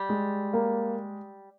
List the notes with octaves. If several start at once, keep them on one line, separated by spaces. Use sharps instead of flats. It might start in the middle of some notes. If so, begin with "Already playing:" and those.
Already playing: G3
G#3
A#3